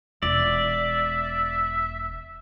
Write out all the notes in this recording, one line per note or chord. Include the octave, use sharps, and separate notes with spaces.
E1 D5 E5